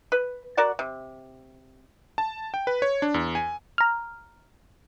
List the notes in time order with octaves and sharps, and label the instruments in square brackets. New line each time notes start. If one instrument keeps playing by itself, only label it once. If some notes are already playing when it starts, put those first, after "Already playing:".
[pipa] B4
F#4 A#4 D5 F#5
C3
[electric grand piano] A5
G5
B4
C#5
D4
E2
G#5
[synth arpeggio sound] A#5 F6